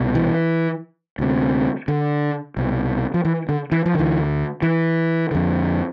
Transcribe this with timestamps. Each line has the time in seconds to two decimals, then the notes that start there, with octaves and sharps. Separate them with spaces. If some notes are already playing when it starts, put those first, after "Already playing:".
Already playing: C2 B2
0.15 E3
1.19 D2 C3
1.88 D3
2.57 C2 B2
3.14 F3
3.25 E3
3.49 D3
3.72 E3
3.86 F3
3.94 D2 D3 E3
4.62 E3
5.31 F2 D3